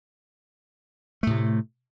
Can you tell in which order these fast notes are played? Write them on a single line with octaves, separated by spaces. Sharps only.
A3 A2 C3